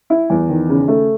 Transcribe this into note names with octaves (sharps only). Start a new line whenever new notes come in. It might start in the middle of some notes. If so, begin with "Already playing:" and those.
E4
E2
D#3
C#3
A3